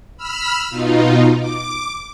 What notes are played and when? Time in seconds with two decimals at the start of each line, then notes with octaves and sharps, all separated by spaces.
0.17 B5 E6 F6
0.70 B2 D#4 F4
1.39 D6